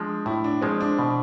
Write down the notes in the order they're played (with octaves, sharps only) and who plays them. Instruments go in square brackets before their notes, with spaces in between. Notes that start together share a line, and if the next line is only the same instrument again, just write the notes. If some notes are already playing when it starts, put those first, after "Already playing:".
Already playing: [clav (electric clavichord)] F3 G#3 [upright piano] D4
[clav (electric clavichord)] A2 [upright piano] E4
[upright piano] D4
[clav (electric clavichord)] F3 G#3 [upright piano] C4
[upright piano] D4
[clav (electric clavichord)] B2